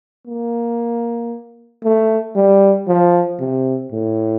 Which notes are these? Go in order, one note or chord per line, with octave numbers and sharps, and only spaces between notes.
A#3
A3
G3
F3
C3
A2